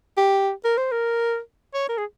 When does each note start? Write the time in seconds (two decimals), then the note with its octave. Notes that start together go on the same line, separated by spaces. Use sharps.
0.18 G4
0.64 A#4
0.78 C5
0.92 A#4
1.74 C#5
1.89 A#4
1.98 G#4